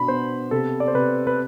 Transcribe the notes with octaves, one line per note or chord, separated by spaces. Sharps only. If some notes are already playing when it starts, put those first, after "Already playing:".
Already playing: B2 D4 B5
B3 C5
C3 A4
D5
C5
C3 B4
B4